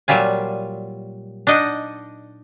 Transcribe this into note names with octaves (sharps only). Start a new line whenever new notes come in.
A#2 F#3 G3 F4 G#5
D4 D#4 D#5 F#5